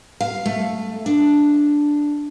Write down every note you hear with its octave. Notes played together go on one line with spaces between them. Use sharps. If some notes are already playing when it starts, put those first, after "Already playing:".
F5
A3
D4